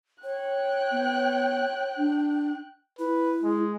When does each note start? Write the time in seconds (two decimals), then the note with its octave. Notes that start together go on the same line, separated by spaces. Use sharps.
0.24 C#5 G5 F#6
0.92 B3
1.97 D4
2.99 E4 B4
3.43 G#3